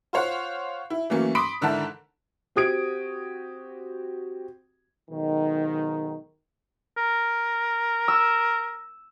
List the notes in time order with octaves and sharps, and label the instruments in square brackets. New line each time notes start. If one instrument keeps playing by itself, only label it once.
[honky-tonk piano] F4 C5 C#5 F5 F#5
E4
E3 F#3 A3 A#3 C#4
B5 C6 D6 D#6 B6 D7
G#2 D3 D#3 E4 F#5 A5
[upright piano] C4 F#4 G4 D#6 G#6 D7
[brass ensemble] B1 G#2 D#3
[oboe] A#4
[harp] E6